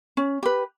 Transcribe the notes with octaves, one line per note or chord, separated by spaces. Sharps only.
C#4
G4 B4